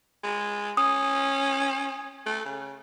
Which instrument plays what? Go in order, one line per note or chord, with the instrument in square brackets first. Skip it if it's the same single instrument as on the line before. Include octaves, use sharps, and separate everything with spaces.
[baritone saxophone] G#3
[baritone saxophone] C#4 [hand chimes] D#6
[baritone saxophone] A3
C#3